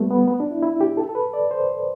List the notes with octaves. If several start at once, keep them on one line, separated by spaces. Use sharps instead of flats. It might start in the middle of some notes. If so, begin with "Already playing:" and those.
Already playing: G3 A3 B3
B3
B3
D4
E4
E4
G4
A4
A4
B4
D5
C5